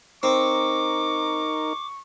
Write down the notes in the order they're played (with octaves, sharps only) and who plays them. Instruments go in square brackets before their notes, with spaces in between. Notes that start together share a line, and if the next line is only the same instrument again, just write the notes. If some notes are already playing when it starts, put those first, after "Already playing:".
[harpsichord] C4 [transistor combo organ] D#4 A#4 [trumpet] C#6 [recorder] D6